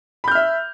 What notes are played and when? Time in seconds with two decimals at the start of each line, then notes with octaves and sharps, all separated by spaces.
0.24 B5
0.28 G6
0.31 F6
0.35 E5